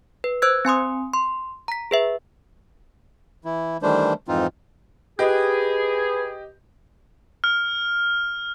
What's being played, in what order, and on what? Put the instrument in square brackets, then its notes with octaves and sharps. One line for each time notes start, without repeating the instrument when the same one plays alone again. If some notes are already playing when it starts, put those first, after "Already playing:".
[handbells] B4
C5 E6 F#6 G#6
C4 G#5 C6 D#6
C6
A#5 B6
G#4 B4 E5
[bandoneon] E3 E4
D#3 E3 G3 A3 D4 C5
F2 G#2 E3 C4 D#4 F4
[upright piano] G4 D#5 [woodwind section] G#4 [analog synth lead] B4
[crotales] F6